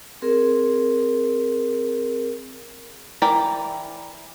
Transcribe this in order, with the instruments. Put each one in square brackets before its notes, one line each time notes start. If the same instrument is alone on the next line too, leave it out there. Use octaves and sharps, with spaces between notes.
[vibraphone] C4 G#4 A#4
[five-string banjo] E3 E4 A#4 D5 G5